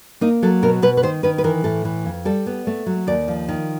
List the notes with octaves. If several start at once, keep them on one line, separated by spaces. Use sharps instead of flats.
A#3 D#4
F#3 A4
B2 A#4
B2 B4
B4
D#3 C5
D#3 B4
B4
E3 A#4
A2 A4
E3
F2
G3 A4
B3
A3
F#3
D#2 D5
F3
D#3